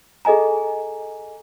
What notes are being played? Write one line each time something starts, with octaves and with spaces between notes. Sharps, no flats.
G#4 A4 D#5 G#5 A#5